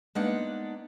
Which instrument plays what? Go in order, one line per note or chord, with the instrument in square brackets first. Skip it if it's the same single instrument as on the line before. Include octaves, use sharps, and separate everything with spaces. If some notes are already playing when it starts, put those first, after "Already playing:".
[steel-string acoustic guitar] G#3 A#3 B3 D4 D#4 F#5